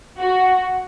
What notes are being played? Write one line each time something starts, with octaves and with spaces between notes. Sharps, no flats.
F#4